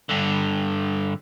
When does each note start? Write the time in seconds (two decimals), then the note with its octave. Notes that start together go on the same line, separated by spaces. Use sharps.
0.09 G2 D3